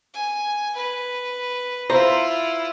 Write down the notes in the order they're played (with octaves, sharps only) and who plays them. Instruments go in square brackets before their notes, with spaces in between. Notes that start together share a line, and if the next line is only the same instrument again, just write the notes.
[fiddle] G#5
B4
[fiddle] E4 F4 [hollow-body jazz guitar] C5 A#5 C6